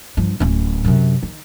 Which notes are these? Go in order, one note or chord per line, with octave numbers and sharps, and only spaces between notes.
G2 F3
D1 C#4
F#2 C3
D#3